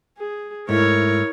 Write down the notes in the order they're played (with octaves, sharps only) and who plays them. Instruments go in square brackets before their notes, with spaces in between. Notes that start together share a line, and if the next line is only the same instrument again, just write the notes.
[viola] G#4
[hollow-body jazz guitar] G#2 A3 [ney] E4 [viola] A#4 C#5